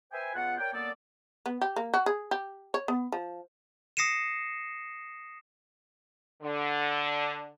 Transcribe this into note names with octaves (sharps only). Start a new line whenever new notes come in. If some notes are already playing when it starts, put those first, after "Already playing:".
B4 C5 E5 G5 G#5
C#2 B3 F4 F#5
A#4 C#5 D5 G5
F#2 A#3 B3 A4 D5
B3
G4
A#3
F#4
G#4
G4
C#5
B3
F3
D#6 A#6 C7 C#7 D#7 E7
D3